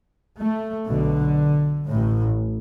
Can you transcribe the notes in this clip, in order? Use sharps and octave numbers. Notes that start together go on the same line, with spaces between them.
A3
B1 B2 D3
A1 A2